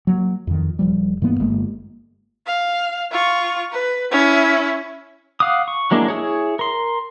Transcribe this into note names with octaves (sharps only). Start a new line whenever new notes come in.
F#3 G3 A#3
F2 D#3
D#1 F3 G3
G#2 E3 A#3 B3
G1 G#3 A#3
F5
F4 C#6
B4
C#4 E4
F5 F#5 D6 D#6
C#6
F#3 G#3 A#3 D4 E4
E4 G#4 C#5
A#4 C6